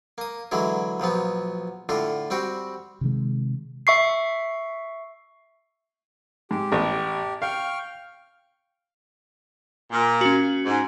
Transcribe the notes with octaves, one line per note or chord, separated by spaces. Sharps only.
A#3 D#6
D3 E3 F#3 G#3 D4 E4
A#1 F3 F#3 B3
A2 D3 D4 F4
G3 C4 F#4 G5
C3 D#3 G#3
E5 C#6 C7
G#2 G4
A1 B3
F5 G5 C#6 F6
A#2
C#4 F#4
G#2